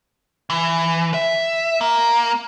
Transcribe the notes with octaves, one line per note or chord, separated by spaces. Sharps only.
E3
E5
A#3